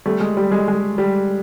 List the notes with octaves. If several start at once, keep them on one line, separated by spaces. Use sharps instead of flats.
G3 A3
G#3
G3
G#3
G#3
G3